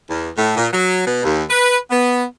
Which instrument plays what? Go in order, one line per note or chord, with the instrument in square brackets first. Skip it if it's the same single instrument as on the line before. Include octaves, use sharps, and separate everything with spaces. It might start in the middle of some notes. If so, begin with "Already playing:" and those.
[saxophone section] E2
A2
A#2
F#3
B2
D#2
B4
B3